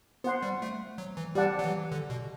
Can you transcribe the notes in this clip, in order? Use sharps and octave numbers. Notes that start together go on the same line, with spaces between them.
B3 C5 F#5 C6
G3
A3
F#3
E3
G3 G4 D5 F#5 A5
F#3
E3
D3
B2